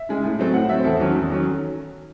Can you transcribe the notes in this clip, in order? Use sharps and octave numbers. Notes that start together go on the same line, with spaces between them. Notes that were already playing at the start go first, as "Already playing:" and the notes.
Already playing: E5
C#3 G#3
A2
F#3 A3 C4
A2 F#5
F#3 A3 C4 E5
C5
E2 A4
D#3 F#3 C#4
E2
D#3 F#3 C#4